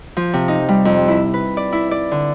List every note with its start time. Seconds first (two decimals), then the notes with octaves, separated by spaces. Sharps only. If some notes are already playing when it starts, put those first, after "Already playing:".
0.17 F3
0.33 C3
0.48 D#4
0.69 G3
0.85 F2
1.08 E4
1.34 B4
1.57 D5
1.72 E4
1.91 D5
2.11 D3